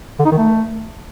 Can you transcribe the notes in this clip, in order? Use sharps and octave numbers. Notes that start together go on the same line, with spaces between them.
D3
D#4
D#3
A3